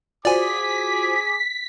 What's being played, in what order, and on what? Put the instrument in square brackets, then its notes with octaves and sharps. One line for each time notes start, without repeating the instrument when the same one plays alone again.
[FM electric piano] F4 F#4 C5 [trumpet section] G#4 D6 [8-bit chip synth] D5 G#5 [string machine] B6